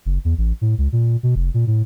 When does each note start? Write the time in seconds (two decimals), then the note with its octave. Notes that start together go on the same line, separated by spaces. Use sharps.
0.05 F#1
0.25 E2
0.38 A1
0.61 A2
0.78 C#2
0.92 A#2
1.23 B2
1.35 F1
1.54 A#2
1.67 A2